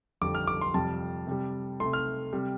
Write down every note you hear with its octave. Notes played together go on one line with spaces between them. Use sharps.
F2 D3 G3 D6
F6
D6
C6
F2 C3 G3 A5
C3 G3
C3 A3 C6
F6
C3 G3